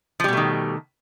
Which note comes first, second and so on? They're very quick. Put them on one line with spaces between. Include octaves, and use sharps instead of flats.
F3 G3 B2 A3 D#3